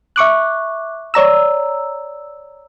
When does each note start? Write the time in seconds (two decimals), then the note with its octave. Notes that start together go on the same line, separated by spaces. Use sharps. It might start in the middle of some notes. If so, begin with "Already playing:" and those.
0.16 E5 C#6 D6 F#6
1.14 C#5 D5 A#5 E6